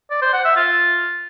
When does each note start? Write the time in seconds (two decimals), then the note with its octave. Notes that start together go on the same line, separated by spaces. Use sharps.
0.10 D5
0.22 C5
0.33 F#5
0.45 E5
0.56 F4